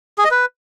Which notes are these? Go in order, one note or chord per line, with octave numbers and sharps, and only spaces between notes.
G#4
D#5
B4